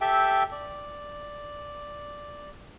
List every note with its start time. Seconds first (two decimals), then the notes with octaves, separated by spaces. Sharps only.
0.01 G4 A4 E5 G5
0.52 D5